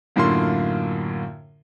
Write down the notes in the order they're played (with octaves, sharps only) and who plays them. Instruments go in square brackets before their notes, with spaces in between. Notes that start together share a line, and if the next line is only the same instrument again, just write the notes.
[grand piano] F#2 A2 D3 A#3 F4 C6